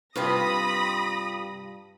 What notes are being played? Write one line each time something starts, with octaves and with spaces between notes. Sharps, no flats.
G2 C3 F4 G4 B4 B5 D#6 A#6